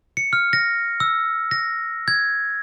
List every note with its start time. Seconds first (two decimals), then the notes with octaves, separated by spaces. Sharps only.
0.17 C#7
0.33 F6
0.53 A#6
1.00 E6
1.51 A#6
2.08 G#6